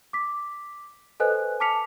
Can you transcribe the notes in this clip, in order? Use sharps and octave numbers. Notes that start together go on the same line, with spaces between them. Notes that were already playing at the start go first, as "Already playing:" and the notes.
D6 B6
A4 B4 C5 D#5 G#5 F#6
A5 D6 F6 B6 C#7 F7